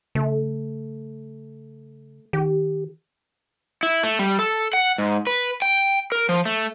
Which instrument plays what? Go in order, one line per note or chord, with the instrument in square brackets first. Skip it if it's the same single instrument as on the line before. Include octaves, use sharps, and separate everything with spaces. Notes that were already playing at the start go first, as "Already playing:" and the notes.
[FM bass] C#3 [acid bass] A3
[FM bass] D#3 [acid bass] G4
[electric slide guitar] E4
A3
G3
A4
F#5
G#2
B4
G5
A#4
F3
A3